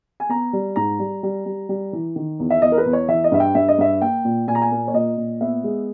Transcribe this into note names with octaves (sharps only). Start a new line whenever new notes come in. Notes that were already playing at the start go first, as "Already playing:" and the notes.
G#5
B3 A#5
G3
G#2 A#5
G3
G3
G3
G3
E3
D#3
E2
E5
E2 D#5
A#4
B4
E2
C#5
E3 E5
D#5
G2 E5
G5
G2 E5
D#5
G2 E5
A#3 G5
A#2
A#2 G#5
A#5
G#5
A#3
C#5
A#2 D#5
A#2
B3 E5
G#3